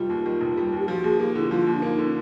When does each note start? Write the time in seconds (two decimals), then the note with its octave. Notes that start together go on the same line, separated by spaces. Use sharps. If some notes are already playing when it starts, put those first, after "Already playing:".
Already playing: F1 D#3 G3 F4
0.10 D#2
0.26 D#3
0.41 F1
0.57 G3
0.72 D#2
0.78 G4
0.88 F3 F#4
1.04 D#2 G#4
1.20 A#3 G4
1.35 D3 E4
1.51 F3 F4
1.67 D#2
1.75 D4
1.82 A#3 D#4
1.99 D3
2.05 C#4